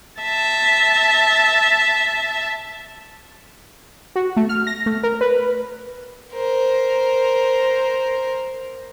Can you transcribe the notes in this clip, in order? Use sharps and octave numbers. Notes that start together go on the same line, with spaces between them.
E5 A5
F#4
A3
F6
A#6
A3
A#4
B4
A#4 C5